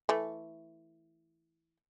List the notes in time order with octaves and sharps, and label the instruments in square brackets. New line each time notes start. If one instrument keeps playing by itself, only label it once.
[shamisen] E3 A3